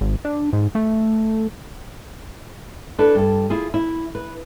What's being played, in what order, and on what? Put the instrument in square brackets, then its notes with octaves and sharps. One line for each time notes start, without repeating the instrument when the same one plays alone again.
[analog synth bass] G#1
D4
G#2
A3
[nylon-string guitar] D4 E4 A4 B4
G2 A4
E4 F4 G#4
E4
B4